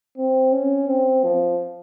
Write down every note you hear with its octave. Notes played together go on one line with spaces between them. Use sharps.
C4
C#4
C4
F3